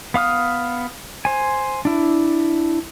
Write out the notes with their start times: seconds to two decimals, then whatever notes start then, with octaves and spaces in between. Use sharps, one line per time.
0.14 B3 F5 D#6 F6
1.25 C5 G#5
1.85 D4 E4